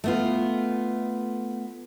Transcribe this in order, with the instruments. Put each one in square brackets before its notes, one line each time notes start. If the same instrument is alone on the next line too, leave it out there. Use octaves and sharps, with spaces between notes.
[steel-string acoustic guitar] A3 B3 F4